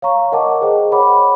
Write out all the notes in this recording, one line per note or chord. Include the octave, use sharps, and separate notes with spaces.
C#5 F5 A#5 C#6
A#4 D#5 F#5 A5 D6
G#4 C5 D#5 G5
C#5 F#5 B5 D6